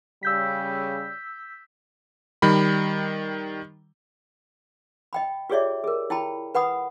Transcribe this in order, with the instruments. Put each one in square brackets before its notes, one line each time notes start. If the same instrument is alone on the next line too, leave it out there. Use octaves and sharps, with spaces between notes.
[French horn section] C#3 G3 [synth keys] E6 G6 B6
[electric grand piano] D#3 G3 B5
[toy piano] D#5 G5 B5
F4 G4 G#4 C#5 D5 E5
G#4 A#4
E4 G5 A5 B5
B4 F#5 B5 D#6